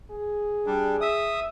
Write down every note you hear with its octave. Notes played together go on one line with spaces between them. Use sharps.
G#4
G3 D4
E5 D#6